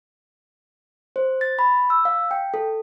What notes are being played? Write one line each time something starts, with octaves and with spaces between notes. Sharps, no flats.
C5
A6
B5
E6
F5
G5
A4